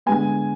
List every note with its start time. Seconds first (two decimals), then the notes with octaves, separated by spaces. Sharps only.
0.06 D3 G#3 B3 G#5